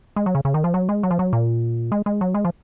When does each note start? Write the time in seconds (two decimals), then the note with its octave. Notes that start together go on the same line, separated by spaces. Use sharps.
0.16 G#3
0.26 F#3
0.35 C#3
0.45 C#3
0.54 D#3
0.64 F3
0.74 F#3
0.89 G#3
1.03 F#3
1.11 F3
1.19 F#3
1.33 A#2
1.92 G#3
2.06 G#3
2.21 F#3
2.34 G#3
2.45 F3